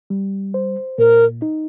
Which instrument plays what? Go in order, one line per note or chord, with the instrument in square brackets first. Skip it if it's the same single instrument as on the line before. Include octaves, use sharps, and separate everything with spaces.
[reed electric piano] G3
C5
[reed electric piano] A#2 [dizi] A#4
[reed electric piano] D#4